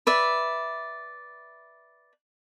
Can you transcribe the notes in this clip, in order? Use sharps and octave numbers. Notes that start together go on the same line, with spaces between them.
B4 D5 E5